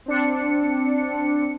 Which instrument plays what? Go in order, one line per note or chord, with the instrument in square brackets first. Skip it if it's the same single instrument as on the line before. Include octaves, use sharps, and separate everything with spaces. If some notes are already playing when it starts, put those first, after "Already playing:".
[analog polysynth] C4 D4 C#7